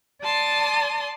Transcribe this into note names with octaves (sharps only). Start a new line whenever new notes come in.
D5 A5 C6 D#6